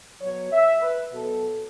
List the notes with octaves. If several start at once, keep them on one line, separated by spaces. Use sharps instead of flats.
B2 F#3 C#5
E5
B4
B2 F#3 A4